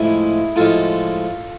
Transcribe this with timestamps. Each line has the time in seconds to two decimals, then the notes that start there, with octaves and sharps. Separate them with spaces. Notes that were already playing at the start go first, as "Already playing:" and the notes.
Already playing: A2 F3 G#3 E4 G#4
0.56 A2 F3 G#3 F4 A4